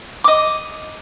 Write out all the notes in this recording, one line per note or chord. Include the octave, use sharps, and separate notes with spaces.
D#5 D6